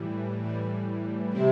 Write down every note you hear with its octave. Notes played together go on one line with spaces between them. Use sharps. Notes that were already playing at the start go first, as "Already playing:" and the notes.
Already playing: A2 E3 G3
A2 E3 G3
C3 G3 C4 E4